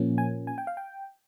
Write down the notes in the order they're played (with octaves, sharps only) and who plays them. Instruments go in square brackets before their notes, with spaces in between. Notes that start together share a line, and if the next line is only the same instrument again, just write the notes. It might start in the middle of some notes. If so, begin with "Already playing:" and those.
Already playing: [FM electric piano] A#2 F3 A#3 C#4
G#5
G#5
G5
F5
G5